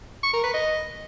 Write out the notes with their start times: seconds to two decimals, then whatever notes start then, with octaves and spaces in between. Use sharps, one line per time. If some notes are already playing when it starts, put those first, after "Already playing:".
0.23 C#6
0.33 A#4
0.43 B4
0.54 D#5